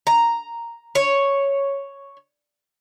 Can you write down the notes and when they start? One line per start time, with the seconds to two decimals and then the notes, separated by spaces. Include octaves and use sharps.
0.07 A#5
0.95 C#5